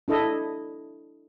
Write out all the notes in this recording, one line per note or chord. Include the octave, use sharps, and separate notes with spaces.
D4 E4 A4 D#5